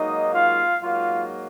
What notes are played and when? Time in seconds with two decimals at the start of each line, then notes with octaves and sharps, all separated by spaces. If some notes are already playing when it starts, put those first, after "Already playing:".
Already playing: G#2 F#3 A#3 D#4 D#5
0.34 F4 F5
0.83 G#2 F#3 A#3 F4 F5